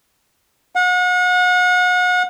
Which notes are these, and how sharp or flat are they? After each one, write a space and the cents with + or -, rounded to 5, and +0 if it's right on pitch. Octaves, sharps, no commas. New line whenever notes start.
F#5 -35